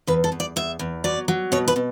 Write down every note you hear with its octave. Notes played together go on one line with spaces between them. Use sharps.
E2 B4
A4
E2
D5
E2 E5
E2
F#3 D5
F#3
B2 C#5
B4
B2